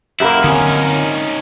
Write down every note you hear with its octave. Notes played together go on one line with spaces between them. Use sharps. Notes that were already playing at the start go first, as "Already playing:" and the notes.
F#2 A#3 E4 G4 A#5 B5
D3 C4 C#4 D#4 G#5 D#6